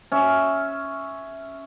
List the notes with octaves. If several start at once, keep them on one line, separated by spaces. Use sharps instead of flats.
C#4 E5